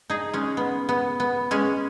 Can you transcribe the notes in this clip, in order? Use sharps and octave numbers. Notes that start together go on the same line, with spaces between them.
D#4 G#4
G#3 C#4
B3
B3
B3
G#3 C#4